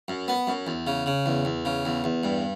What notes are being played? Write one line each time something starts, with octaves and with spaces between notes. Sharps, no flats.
F#2
B3
F#2
E2
C#3
C#3
E2
E2
C#3
E2
E2
G2